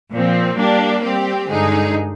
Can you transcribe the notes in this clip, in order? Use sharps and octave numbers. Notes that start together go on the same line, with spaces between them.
A#2 F3 C4
G3 A#3 D4 G4
G3 C4 G4
G2 D3 G#3 D#4 G#4